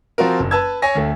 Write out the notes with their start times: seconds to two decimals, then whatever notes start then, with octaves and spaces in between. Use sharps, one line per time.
0.18 F3 C4 F4 F#4 A#4
0.40 F#1
0.51 B4 A5 E6 G#6
0.82 C#5 G#5 A#6
0.95 D2 A3